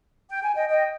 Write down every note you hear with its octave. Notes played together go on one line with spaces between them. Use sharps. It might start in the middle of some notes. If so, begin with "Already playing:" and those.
G5
G#5
D#5 G5
D#5 G5